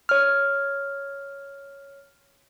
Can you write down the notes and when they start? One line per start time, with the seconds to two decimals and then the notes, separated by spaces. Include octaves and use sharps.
0.09 C#5 F6